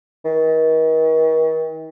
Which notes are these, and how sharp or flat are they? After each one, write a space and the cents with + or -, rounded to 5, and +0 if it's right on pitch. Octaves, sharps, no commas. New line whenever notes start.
D#3 +40